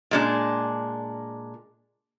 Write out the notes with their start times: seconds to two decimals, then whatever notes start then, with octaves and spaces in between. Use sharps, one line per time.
0.11 A#2 G#3 D4